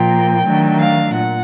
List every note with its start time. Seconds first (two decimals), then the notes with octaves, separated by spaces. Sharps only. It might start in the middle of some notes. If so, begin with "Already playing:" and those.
Already playing: A#2 F3 A#3 G5
0.46 D#3 F#3 A3 D4
0.79 F5
1.13 A#2 F#5